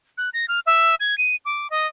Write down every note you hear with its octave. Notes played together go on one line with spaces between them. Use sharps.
F#6
A#6
F6
E5
G#6
D#7
D6
D#5